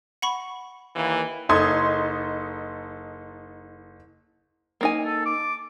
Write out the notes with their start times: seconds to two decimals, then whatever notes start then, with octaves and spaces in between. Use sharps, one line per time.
0.22 F#5 B5 C#6
0.96 D#2 E3 A#3
1.49 F#1 D#4 A4 C6 D#6 G#6
4.81 A#3 D#4 G#5
5.05 A4
5.26 D6